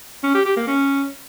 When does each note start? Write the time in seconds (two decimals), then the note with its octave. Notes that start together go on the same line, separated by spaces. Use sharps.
0.23 C#4
0.35 G4
0.46 G4
0.57 A#3
0.68 C#4